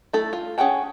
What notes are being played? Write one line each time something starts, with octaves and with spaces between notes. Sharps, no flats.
A3 E4 A4
F4
C#4 G#4 F#5 G5 A5